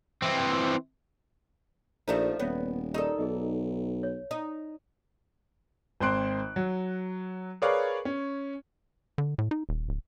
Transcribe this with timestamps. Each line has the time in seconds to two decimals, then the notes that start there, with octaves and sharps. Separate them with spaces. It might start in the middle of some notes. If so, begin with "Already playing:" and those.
0.22 E3 C4
2.08 A#1 F3 A3 D#4 C5 D5 E5
2.40 D#1 B3 C#5 E5
2.94 D#4 G4 A4 A#4 D5
3.18 B1 G#4 D#5
4.03 C#5
4.31 D#4
6.01 G#1 C4 C5 C6 F#6 D7
6.56 F#3
7.62 G#4 A#4 B4 C#5 D5 F5
8.05 C#4
9.18 D3
9.38 A2
9.51 D#4
9.69 D#1
9.89 D1